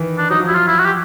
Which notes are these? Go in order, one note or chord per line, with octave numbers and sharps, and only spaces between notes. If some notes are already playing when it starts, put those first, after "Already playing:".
Already playing: D#3 E3
D4
F#3 D#4
F3
E4
F#3 F4
E4
F#4
G4